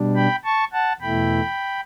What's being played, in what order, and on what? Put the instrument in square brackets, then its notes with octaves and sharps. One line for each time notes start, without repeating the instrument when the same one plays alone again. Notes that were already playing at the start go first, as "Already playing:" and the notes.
Already playing: [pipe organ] B2 G3 D4
G5 B5
A5 C#6
F#5 A5
E2 B2 A3 E4 G5 B5